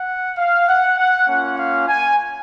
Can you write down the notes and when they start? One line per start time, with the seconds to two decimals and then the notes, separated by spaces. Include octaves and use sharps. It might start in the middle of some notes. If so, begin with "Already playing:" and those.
Already playing: F#5
0.37 F5
0.68 F#5
0.97 F#5
1.28 A#3 C#4 F4 F#5
1.58 F5
1.88 G#5